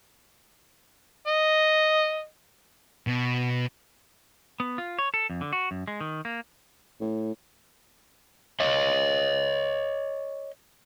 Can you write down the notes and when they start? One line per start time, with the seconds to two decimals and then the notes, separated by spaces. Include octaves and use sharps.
1.27 D#5
3.07 B2
4.60 B3
4.78 F4
4.98 C#5
5.14 A4
5.30 F2
5.41 D3
5.53 F#4
5.71 F#2
5.88 G#3
6.01 D#3
6.25 A#3
7.00 A2
8.60 C#5 D#5